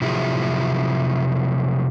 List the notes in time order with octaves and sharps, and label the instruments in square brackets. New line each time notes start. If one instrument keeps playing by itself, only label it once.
[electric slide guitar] C3 F3 F#3 E4 G#4